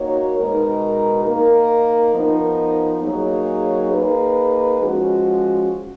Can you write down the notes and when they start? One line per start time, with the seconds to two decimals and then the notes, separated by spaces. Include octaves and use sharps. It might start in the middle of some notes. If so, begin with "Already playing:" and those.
Already playing: A#3 D#4 F#4 C#5
0.37 B2 G#3 D#4 A#4
1.25 A#3 D#4 A#4
2.14 F3 B3 D#4 A#4
3.03 F#3 A#3 D#4 G#4 C#5
3.92 A#3 D#4 G#4 B4
4.80 F3 G#3 C#4 F#4